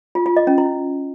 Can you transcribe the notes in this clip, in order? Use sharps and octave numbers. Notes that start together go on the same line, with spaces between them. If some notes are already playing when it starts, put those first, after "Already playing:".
F4
F4
D#5
C#4
E4